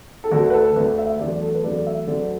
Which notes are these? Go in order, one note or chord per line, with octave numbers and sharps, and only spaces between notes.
A4
D2 D3 A3 F#4
B4
A4
D2 D3 A3 B4
D5
E5
E5
E2 D3 F#3 A3 D5
A4
B4
E2 D3 F#3 A3 D5
D5
E5
D2 D3 F#3 D4 D5